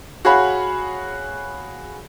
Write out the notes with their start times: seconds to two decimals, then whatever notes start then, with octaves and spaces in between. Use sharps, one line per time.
0.25 F#4 G#4 C#5 F5 F#5 B5